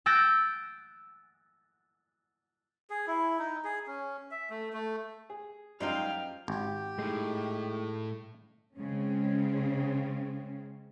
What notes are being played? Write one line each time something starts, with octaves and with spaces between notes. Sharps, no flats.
E6 F#6 G6 A6 A#6 D7
G#4
E4
D#4
G#4
C#4
E5
A3
A3
G#4
F#2 F3 G3 G#3 D#4 F5 G5
G#1 G4
A2 G#3 D#4
C#3 G#3 C4 C#4